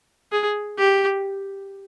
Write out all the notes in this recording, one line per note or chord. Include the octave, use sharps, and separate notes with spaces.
G#4
G4